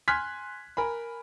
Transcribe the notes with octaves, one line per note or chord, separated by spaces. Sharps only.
G#5 C6 F6 F#6 G#6 B6
A#4 G#5 B5